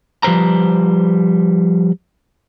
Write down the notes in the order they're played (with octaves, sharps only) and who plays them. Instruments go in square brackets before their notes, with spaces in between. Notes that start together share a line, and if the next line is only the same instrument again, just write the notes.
[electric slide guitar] F3 G3 B4 C5 A#5